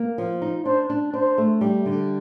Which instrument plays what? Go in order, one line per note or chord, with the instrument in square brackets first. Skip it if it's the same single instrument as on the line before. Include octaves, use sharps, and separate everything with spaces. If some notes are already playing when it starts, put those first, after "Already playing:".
Already playing: [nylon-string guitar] A#3
F3
D#4
[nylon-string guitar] D4 [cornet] C5
[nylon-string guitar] D4
[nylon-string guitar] D4 [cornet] C5
[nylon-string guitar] A3
G3
D3